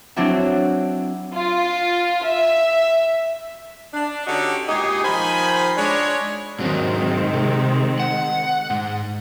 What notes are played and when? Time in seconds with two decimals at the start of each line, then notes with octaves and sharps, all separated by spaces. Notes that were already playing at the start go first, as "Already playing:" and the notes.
0.16 F#3 C4 D4 E4 F#4
1.34 F4
2.25 E5
3.94 D4
4.27 D3 C#4 D#4 F#4 G4
4.69 A#2 G#3 D#4 G4 G#4
5.04 D#3 F3 C5 G#5 B5
5.77 G#3 D4 C#5
6.59 G#2 D#3 F#3 G#3 C4
7.33 C3
8.00 F#5
8.70 G#2